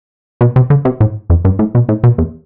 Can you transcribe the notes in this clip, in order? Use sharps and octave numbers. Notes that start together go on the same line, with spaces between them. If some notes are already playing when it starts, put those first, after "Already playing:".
B2
C3
D3
C3
A2
F2
G2
A2
B2
A2
B2
E2